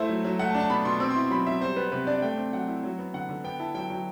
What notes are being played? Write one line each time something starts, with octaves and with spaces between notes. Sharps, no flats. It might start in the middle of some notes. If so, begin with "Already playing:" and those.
Already playing: A3 E4 C5
F#3
F#3
A3 F#5
A5
D4
A5
B2 B5
B2 C6
C4 E6
C6
E4
F#3 B5
F#3 E5
G3 C5
B3 B4
C5
C3 B4
D4 D5
A3 G5
C4
F#3 F#5
E4
F#3
B3
D3 F#5
D3
B3 G5
E4 A5
F#3 G5
F#3 G5